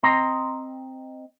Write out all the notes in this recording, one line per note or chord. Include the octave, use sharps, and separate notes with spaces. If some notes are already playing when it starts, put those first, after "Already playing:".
C4 D#5 A#5 C6